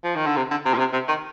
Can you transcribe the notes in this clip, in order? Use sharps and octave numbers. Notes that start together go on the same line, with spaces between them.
F3
D#3
D3
C3
D3
C3
A#2
C3
C3
D#3